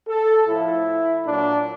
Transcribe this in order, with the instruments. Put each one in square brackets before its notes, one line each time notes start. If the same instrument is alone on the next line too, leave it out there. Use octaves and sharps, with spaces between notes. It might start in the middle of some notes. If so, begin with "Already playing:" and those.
[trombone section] A4
A2 F3 E4
A#2 F#3 D4